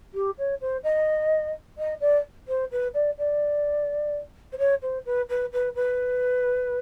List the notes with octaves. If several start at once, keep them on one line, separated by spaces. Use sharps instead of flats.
G4
C#5
C5
D#5
D#5
D5
C5
B4
D5
D5
C5
C#5
C5
B4
B4
B4
B4